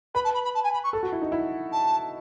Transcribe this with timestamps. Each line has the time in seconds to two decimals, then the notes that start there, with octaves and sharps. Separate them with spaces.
0.15 B4 B5
0.24 A5
0.34 B5
0.44 B5
0.54 A5
0.64 G#5
0.73 B5
0.84 C#6
0.93 A4
1.03 F#4
1.12 E4
1.22 D#4
1.32 E4
1.72 A5